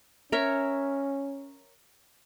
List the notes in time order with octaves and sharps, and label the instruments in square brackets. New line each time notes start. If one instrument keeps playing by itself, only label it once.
[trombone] C#4 [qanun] A#4 C#5 E5